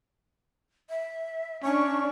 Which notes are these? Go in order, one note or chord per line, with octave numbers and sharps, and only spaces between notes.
E5
C#4 D4 C#6